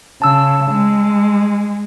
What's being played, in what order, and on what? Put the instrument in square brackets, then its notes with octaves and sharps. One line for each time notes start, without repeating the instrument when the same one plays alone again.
[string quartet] C#3 [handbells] A5 E6
[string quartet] G#3